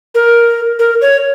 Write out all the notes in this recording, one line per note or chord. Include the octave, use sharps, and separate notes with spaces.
A#4
A#4
C#5